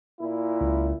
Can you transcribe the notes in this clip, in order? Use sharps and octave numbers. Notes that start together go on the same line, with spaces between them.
A#2 E4
C#2